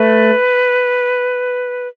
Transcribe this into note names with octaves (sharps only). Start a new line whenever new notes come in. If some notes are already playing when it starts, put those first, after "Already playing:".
Already playing: A3 B4